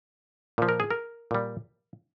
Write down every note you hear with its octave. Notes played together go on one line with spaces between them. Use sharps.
A#2 F3
A#4
G#4
A#4
A#2 G3